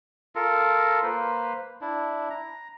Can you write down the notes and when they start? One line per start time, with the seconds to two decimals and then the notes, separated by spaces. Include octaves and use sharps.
0.35 F4 A4 A#4
1.03 A#3 B4 C5
1.81 D4 E4
2.30 A#5